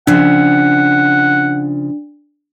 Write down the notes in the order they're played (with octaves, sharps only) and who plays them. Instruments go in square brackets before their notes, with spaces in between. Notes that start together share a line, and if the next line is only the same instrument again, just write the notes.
[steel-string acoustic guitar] C#3 F3 [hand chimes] D4 [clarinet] F#5